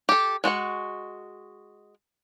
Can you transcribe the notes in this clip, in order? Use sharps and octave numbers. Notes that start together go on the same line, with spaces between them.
G4 A4
G#3 F#4 B4 F#5